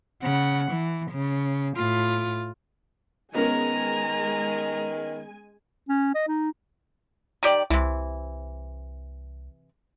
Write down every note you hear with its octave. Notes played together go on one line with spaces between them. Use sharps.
C#3 F#5
E3
C#3
A2 F4
D#3 G#3 B3 C#4 A#4 G#5 A#5
C#4
D#5
D#4
D#3 G4 D5
C2 C3 E3